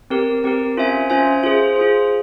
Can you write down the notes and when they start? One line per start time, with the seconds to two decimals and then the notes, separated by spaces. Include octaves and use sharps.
0.10 C4 G4 A#4
0.44 C4 G4 A#4
0.77 C#4 F4 C5 E5 G#5
1.10 C#4 F4 C5 E5 G#5
1.43 F4 G#4 C5
1.76 F4 G#4 C5